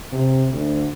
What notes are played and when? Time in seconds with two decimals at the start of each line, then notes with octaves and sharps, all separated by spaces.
0.12 C3
0.51 D2